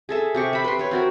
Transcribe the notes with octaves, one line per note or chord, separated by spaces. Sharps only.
G#4 A4 E5
C3 G4 C#6
E5 B5
B4 G5 C6
B4 C#5
C4 F#4 A#4